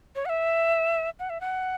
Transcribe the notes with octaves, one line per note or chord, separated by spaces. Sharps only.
C#5
F#5
E5
F#5
E5
F#5